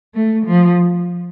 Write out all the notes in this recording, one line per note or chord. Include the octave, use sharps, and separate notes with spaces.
A3
F3